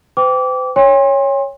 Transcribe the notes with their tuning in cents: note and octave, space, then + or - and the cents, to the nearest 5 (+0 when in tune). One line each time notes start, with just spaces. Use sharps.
C5 -45 G5 +0 D6 -25
C#5 +0 G5 +45 C6 +25